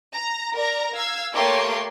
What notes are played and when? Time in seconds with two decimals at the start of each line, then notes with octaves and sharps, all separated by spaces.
0.13 A#5
0.55 A#4 D5 A#5
0.94 F5 E6 G#6
1.34 A3 A#3 G4 C#5 C6 D6